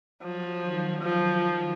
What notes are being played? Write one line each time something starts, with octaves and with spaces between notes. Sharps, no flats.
F3 F#3
D#3
F3 F#3